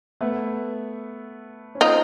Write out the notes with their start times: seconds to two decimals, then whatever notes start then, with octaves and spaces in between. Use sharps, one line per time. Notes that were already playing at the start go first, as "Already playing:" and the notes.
0.21 A3 B3
1.75 C#4
1.81 A#3 C4 D#4 F4